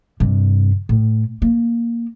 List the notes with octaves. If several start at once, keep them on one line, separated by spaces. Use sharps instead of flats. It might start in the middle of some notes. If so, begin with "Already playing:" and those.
G2 C3
A2
A#3